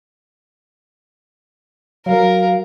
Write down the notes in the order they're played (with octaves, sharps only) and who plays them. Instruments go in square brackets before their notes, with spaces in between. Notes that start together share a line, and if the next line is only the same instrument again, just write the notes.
[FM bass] F#3 [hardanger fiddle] A#4 [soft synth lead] F5